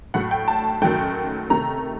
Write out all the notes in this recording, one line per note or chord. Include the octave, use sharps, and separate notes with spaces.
A2 F#3 A3 F#5
G5
A5
F#2 D#3 F#3 A3 G5
C3 D#3 A3 A#5